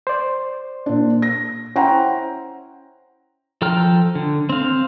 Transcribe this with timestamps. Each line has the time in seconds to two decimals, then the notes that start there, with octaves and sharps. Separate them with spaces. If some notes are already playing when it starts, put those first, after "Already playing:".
0.07 C5 D5
0.86 A#2 D4
1.22 A#6
1.76 C#4 E4 C5 F#5 G5 A#5
3.62 F3 A4 G5 A#5 F6
4.15 D3
4.49 C4 F5